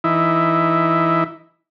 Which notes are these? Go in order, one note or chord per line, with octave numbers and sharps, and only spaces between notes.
E3 D#4 E4